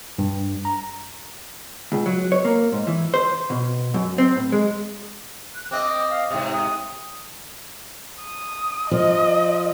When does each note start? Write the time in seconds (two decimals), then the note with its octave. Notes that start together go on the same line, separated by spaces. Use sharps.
0.19 G2
0.65 A#5
1.92 C#2
2.06 F#3
2.32 C#5
2.45 A#3
2.72 G#2
2.87 E3
3.14 C5
3.50 B2
3.94 F#2
4.18 C4
4.36 A2
4.52 G#3
5.55 F#6
5.71 C4 D#5 D6
6.11 F5
6.30 G#2 C3 D#6
6.52 D#6
8.21 D#6
8.91 F3 D#5